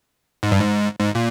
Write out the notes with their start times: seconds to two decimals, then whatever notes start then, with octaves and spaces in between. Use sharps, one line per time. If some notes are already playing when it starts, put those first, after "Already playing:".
0.43 G#2
0.52 G2
0.59 G#2
1.00 G#2
1.15 A#2